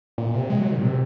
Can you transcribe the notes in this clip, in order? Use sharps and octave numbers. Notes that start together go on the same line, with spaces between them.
A#2
C3
G#3
F#3
D#3
A#2
C3